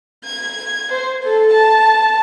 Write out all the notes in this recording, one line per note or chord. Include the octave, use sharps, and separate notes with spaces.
G#6
C5
A4
A5